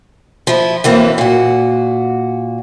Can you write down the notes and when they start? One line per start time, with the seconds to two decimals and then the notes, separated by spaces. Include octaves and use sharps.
0.47 F3 E4
0.84 F#2 E3 A#3 C4
1.18 A#2 F#4